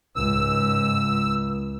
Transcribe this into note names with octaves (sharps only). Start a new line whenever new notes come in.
C#2 G#2 E6